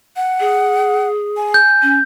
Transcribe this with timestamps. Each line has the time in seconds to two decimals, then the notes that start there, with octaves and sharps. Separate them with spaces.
0.16 F#5
0.40 G#4
1.37 G#5
1.54 G6
1.82 C#4